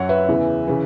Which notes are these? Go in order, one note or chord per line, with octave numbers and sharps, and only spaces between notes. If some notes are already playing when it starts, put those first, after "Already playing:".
Already playing: F#2 F#3 C#5 F#5
B4 E5
E2 C#3 E3
C#3 E3